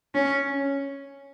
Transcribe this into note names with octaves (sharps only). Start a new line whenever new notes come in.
C#4